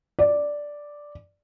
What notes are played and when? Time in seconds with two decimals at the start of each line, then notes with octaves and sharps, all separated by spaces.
0.19 D5